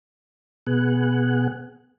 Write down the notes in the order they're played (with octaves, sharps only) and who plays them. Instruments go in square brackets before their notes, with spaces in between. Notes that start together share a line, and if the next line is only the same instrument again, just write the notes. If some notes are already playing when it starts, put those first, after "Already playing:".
[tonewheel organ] B2 B3 G#4 F#5